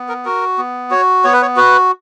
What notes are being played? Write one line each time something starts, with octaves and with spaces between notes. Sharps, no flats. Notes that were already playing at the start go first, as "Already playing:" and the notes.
Already playing: B3
A#4
F#4 A#4
B3
F#4 C#5
B3 C#5
B4
C#5
F#4 B4